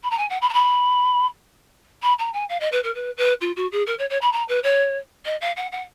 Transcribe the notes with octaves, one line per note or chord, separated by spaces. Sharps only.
B5
A#5
G#5
F#5
B5
A#5
B5
B5
A#5
G#5
F5
D#5
B4
A#4
B4
B4
F4
F#4
G#4
A#4
C#5
C#5
B5
A#5
B4
C#5
D#5
F5
F#5
F#5